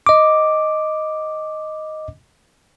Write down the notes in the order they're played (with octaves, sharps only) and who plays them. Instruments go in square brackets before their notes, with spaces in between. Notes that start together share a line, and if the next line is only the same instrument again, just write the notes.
[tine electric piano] D#5 D6